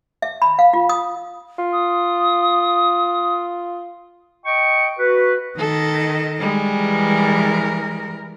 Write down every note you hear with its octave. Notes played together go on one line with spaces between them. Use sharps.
E5
B5
F5
F4
D#6
F4
D#6
D#5 G5 C#6
F#4 B4
D#3 A4 D#5
G3 G#3
E3 A#4